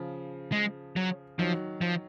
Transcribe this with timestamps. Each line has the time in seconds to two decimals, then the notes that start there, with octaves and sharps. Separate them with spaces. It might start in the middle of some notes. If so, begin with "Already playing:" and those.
Already playing: C#3 F3
0.52 G#3
0.96 F#3
1.38 D#3 F3 F#3
1.81 F3